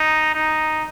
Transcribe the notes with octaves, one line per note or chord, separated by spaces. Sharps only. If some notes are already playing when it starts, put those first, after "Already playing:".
Already playing: D#4
D#4